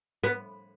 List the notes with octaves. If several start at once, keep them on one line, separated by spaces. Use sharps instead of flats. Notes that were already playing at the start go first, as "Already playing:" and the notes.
B3